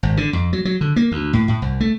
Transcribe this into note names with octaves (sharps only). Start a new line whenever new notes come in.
G#1
D3
F2
F#3
F#3
D3
A#3
D2
A2
A2
C2
A3